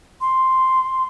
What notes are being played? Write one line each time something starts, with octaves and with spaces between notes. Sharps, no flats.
C6